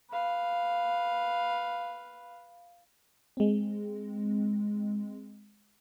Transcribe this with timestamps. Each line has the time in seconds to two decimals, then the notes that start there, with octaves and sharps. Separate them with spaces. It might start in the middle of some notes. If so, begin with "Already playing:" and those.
0.10 B4 F5
3.37 G#3 C4